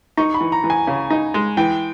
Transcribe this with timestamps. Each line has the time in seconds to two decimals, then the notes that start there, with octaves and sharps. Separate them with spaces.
0.17 D#4 C#6
0.34 B5
0.40 E3
0.52 A#5
0.64 E3
0.70 G#5
0.87 C#3
1.10 D#4
1.34 G#3
1.57 E3 G5